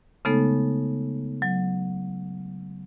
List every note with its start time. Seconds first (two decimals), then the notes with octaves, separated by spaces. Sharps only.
0.25 C#3 G#3 A3 B3 D#4 A4
1.42 F#3